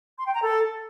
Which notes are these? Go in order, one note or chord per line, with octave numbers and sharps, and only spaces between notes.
C6
G5
A#5
A4